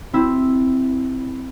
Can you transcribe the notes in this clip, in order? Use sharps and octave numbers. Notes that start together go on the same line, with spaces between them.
C4 E4